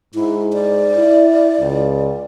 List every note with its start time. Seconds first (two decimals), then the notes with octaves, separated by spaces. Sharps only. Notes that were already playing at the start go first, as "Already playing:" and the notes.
0.15 G#2 E4
0.53 D5
0.96 E4
1.61 C#2